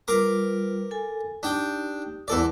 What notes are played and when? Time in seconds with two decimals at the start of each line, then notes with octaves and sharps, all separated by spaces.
0.08 G3 F4 A#4 B4 D6
0.91 A4 G#5
1.43 D4 D#4 G4 G5
2.28 E2 A4 D5